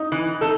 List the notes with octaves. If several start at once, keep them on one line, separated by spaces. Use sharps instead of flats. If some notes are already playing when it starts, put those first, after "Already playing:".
Already playing: D#4
E3
D#4 A4